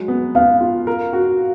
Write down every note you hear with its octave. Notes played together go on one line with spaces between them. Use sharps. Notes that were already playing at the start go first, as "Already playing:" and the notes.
Already playing: F#3 G#3
B3
B3 F5
F4
A#4
F#4